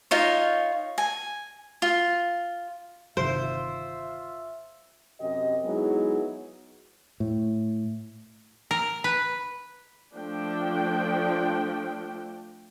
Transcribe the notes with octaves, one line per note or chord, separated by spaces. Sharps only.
D#4 F4 C#5
G#5
F4
G1 C3 D#3 F4 C5 E5
F#2 C3 G4 D#5
F#3 G#3 B3 D#4 E4 G#4
A2
A#4
B4
F3 A3 D4 G5